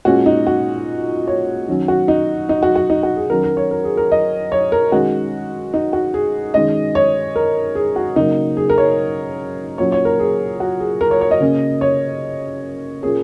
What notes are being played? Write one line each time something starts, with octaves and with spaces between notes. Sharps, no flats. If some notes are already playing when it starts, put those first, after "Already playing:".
A#2 G#3 C#4 F#4
D#4
F#4
C#5
D#3 F#3 C#4
F#4
D#4
D#4
F#4
F#4
D#4
F#4
G#4
D#3 F#3 C#4 A#4
A#4
C#5
A#4
G#4
A#4
D#5
C#5
A#4
D#3 G#3 C#4 F#4
D#4
F#4
G#4
D#3 G#3 C#4 D#5
C#5
A#4
G#4
F#4
C#3 F#3 A#3 D#4
G#4
A#4
C#5
A#2 F#3 C#4 C#5
C#5
A#4
G#4
F#4
G#4
A#4
C#5
C#5
D#5
C#3 A#3 C#4
C#5
A#2 A#3 C#4 G#4